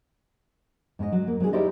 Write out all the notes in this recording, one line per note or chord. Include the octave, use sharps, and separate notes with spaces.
G#2 C#4 C5 D#5
F#3
A#3
F#3 C4 D4 D#4 G#4
D#4 E4 G4 C5 D5 D#5